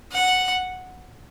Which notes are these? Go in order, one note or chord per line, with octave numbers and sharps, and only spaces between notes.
F#5